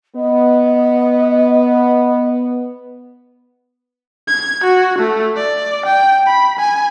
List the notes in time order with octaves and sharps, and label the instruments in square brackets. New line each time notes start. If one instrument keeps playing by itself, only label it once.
[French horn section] B3 [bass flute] D#5
[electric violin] G#6
F#4
A3
D5
G5
B5
G#5